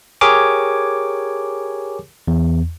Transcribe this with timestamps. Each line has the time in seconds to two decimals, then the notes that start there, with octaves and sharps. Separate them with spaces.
0.21 G4 G#4 A#4 C#5 G#5 D6
2.28 E2